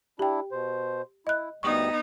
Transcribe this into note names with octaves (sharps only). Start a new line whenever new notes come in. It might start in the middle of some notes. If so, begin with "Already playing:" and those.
D4 E4 G4 G5
B2 C5
E4 D#5 F#6
D2 G3 B3 D#4 C#6 D#6